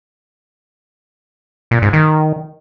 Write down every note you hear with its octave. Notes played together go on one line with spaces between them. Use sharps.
A#2
G#2
D#3